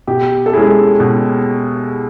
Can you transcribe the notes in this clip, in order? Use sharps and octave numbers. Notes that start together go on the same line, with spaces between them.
B2 G4
A4
G#3 C#4 E4 G#4
B2